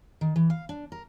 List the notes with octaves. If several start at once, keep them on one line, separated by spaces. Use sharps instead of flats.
D#3
E3
F5
D4
A#4